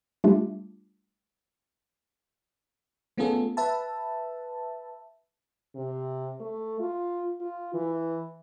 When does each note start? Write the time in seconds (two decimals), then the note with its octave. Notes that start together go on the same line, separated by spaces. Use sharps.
0.24 G3 A3 D4 F4 G4
3.17 A3 B3 C#4 F4 G#4 A4
3.57 B4 E5 A5
5.75 C3
6.40 A3
6.80 F4
7.41 F4
7.74 E3